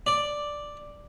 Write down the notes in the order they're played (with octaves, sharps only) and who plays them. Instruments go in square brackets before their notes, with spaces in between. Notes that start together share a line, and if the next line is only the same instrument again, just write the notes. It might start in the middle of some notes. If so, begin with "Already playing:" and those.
[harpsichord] D5